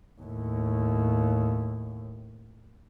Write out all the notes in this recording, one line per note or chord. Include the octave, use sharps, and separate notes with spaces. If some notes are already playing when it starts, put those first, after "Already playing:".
D#2 A2